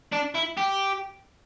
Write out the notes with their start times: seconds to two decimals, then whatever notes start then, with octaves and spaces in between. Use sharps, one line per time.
0.13 D4
0.35 E4
0.58 G4